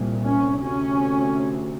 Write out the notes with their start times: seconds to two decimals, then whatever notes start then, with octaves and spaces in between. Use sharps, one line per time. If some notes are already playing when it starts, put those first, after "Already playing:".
Already playing: C2 A#2
0.23 C#4
0.60 D2 C3 C#4